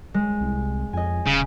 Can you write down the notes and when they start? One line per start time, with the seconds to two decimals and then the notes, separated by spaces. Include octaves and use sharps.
0.14 G#3
0.41 C2
0.93 F2 D#5 G#5
1.27 D#1 C#3